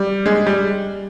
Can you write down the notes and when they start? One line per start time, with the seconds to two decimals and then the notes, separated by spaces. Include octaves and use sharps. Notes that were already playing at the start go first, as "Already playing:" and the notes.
Already playing: G3
0.26 G#3
0.47 G3